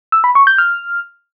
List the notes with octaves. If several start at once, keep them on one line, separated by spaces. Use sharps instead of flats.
E6
B5
C#6
G6
F6